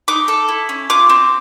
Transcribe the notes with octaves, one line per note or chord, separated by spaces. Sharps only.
D#4 D6
A4
E4
C#4
F4 D6
C4